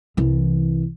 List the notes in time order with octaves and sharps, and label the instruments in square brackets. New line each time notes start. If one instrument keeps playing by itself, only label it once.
[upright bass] C2 E3